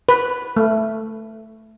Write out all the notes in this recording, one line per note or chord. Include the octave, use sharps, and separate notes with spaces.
B4
A3